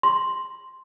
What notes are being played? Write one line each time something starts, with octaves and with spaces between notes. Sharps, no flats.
C6